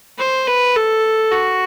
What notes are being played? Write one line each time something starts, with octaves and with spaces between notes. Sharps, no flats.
C5
B4
A4
F#4